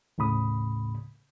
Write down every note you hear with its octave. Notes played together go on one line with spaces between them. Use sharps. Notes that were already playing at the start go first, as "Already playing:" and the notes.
D#2 A2 C#3 B5 D#6